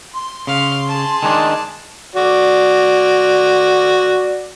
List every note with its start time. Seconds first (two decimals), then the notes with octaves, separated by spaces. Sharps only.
0.14 C6
0.47 C#3 F5
0.87 G#4 A5
1.23 D#3 G#3 D4
2.16 F#4 D5